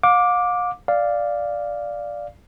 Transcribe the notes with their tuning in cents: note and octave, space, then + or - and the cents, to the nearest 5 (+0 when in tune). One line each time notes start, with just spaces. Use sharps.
F5 +40 D6 +0
D5 +0 F5 +0